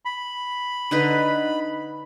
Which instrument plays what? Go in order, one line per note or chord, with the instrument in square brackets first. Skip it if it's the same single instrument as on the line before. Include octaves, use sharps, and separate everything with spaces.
[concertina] B5
[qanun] D3 D#4 B4